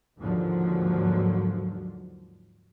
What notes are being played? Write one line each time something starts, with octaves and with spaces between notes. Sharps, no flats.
D#2 G#2 D3 F3 F#3